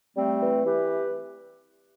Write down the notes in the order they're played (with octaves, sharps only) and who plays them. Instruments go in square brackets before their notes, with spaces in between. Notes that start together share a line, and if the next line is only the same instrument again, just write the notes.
[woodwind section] G3 A3 C4
E3
E3 G4 B4